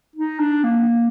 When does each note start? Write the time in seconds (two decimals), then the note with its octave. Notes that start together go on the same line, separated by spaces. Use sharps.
0.16 D#4
0.39 D4
0.64 A#3